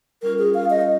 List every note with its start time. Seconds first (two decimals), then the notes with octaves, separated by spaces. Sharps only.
0.23 G3 C#4 F4 A#4
0.39 G#4
0.54 F5
0.70 D#5